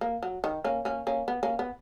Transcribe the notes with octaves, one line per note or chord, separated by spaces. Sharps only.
A#3
F#3
D#3
A#3 C#4
A#3 C#4
A#3 C#4
B3
A#3 C#4
B3